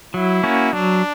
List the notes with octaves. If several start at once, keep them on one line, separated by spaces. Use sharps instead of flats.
F#3 E4
A#3 C#4 F#4
F#3 D4